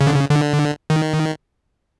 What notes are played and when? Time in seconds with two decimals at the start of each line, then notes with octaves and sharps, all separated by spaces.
0.01 C#3
0.07 D3
0.15 C#3
0.30 D3
0.90 D#3